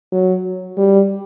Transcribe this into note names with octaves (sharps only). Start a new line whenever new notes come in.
F#3
G3